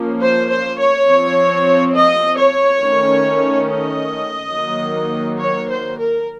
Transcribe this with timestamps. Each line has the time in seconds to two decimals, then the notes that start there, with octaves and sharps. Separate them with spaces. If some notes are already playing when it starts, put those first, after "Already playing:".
Already playing: F3 A#3 C#4
0.20 C5
0.50 C5
0.78 C#5
1.07 F3 C4
1.94 D#5
2.38 C#5
2.80 D#3 A3 C#4
3.68 D#5
4.54 D#3 F#3 A#3
5.41 C#5
5.70 C5
5.98 A#4